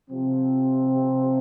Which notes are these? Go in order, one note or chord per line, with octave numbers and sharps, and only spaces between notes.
C3 F3 C4